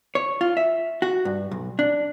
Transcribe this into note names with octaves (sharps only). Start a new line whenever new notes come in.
C#5
F4
E5
F#4
G2
B1
D4